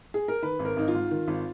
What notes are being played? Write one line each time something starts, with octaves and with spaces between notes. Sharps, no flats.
G#4
A#4
D#3 B4
G#1
A#4
G#1 D#4
F4
G#2
D#3
G#1